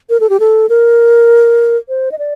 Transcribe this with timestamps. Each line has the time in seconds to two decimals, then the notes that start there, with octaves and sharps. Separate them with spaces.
0.10 A#4
0.20 A4
0.30 G4
0.40 A4
0.69 A#4
1.89 C5
2.12 D#5
2.19 D5